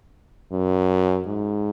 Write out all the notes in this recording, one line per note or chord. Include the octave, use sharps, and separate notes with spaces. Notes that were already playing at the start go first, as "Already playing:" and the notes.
F#2
G#2